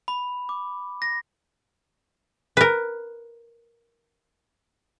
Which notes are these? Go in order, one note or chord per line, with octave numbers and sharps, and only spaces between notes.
B5
D6
A#6
A#4 B4